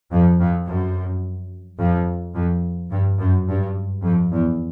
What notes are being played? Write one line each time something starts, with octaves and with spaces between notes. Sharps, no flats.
F2
F2
F#2
F2
F2
G2
F#2
G2
F2
E2